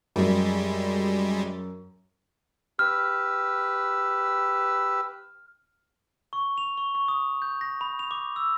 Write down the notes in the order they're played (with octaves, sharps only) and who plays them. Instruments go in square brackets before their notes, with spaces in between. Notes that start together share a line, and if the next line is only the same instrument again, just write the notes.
[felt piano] F#2 [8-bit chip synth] G3 G#3
[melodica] G4 B4 E6 [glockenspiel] F6
[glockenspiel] C#6
F7
C#6
C#6
D#6
G6
A#6
B5
F7
D6
E6